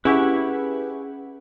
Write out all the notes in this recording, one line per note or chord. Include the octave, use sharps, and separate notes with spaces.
C#4 E4 G4 G#4 B4 F#5 C#6